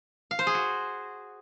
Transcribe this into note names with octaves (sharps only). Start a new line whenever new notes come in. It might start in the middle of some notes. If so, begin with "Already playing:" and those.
F5
C5
G#4
F#4